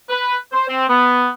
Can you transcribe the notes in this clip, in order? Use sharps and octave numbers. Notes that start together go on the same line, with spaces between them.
B4
C5
C4
B3